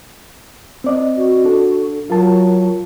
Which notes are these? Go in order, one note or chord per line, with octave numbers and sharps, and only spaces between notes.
C4 D5 D#5
F#4
D4 A4
F#3 F4 A#4 A5